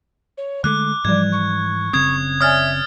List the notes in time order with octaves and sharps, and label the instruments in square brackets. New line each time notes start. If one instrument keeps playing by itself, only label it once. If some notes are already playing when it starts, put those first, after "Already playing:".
[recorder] C#5
[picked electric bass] D3 G#3 A3 [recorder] D6 [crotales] F#6
[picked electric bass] G#2 E3 [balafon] F3 G3 D5 [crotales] G#6
[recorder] C#6
[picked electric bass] F#1 C#3 C4 [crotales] D#6 G#6
[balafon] C#5 D5 G#5 [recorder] E5 [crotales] D#6 F6 A6